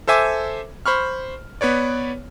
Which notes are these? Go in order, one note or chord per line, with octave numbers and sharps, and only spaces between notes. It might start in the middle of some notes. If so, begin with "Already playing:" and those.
A4 C5 E5 G#5 D6
C5 B5 C#6 F6
B3 B4 C#5 D5